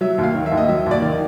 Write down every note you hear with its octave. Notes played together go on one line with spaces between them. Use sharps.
F#3 E5
D#2
F5
D#3
E5
D#2
D#5
F#3 E5
D#2 D5
D#3